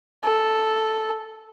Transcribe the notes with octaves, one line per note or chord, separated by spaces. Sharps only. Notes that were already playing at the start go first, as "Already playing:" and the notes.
A4